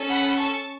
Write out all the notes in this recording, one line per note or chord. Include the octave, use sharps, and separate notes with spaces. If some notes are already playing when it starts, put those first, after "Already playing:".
Already playing: C#4 A4
F#5 B5
A5 C#6